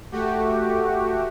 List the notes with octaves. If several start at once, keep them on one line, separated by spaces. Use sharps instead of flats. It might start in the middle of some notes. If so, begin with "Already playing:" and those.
A3 F#4 G4